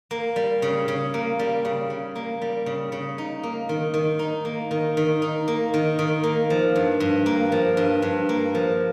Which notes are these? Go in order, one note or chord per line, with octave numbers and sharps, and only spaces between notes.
A#3
G3
C#3
C#3
A#3
G3
C#3
C#3
A#3
G3
C#3
C#3
D#4
A#3
D#3
D#3
D#4
A#3
D#3
D#3
D#4
A#3
D#3
D#3
A#3
F3
G2
G2
A#3
F3
G2
G2
A#3
F3